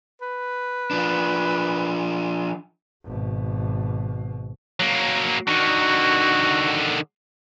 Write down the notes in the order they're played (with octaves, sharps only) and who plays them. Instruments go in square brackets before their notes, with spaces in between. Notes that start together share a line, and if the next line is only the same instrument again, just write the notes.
[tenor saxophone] B4
[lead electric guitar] F3 D4
[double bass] G#1 B2
[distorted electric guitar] F#3 A#3
[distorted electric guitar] D3 D#3 [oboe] F#4